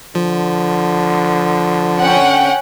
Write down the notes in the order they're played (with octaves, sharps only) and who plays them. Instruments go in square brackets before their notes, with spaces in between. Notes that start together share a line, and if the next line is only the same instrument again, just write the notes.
[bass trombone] D3 [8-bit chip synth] F3
[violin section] C#4 F#5 G5